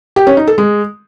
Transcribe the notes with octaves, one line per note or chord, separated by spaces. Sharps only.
G4
C#4
D#4
A4
G#3